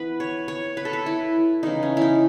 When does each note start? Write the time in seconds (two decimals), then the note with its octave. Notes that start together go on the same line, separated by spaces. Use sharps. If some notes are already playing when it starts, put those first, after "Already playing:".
Already playing: E3 B3 B4
0.20 C#5
0.48 C#5
0.77 B4
0.85 A4
0.93 B4
1.06 E4
1.63 C#3 E3 A3 D#4
1.83 C#4
1.97 D#4 E4